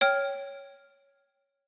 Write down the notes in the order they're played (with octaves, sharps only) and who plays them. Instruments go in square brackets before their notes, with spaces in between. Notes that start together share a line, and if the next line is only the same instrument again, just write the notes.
[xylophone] C#5 G5 F6